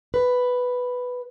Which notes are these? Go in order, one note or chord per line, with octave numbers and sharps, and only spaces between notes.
B4